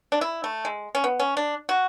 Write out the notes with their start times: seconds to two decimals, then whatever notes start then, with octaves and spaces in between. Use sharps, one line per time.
0.12 D4
0.21 E4
0.44 A3
0.65 G#3
0.95 C#4
1.04 B3
1.20 C#4
1.37 D4
1.69 F#4